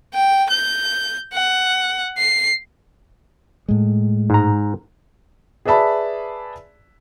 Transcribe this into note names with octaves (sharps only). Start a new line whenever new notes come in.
G5
G6
F#5
C7
A2 G#3
G#2 A#5
G#4 B4 D5 E5 A5 B5